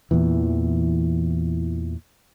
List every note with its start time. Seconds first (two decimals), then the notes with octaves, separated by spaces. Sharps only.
0.11 E2 A#2 E3